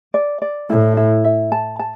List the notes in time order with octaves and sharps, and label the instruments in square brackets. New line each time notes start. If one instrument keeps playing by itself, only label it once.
[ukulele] D5
D5
[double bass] A2 [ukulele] E4
[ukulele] E4
E5
A5
A5